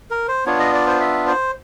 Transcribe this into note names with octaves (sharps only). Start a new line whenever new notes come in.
A#4
C5
B3 D4 F4 C#5
D#5
D5
C5
E5
C5